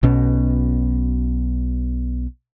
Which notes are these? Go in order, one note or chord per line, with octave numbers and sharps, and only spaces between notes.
B1 B2 C#4